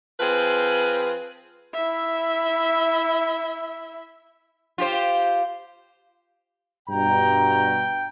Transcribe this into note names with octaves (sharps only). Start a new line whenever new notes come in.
F3 C4 G#4 B4
E4 E5
F4 G4 C5
G2 B2 G5 A#5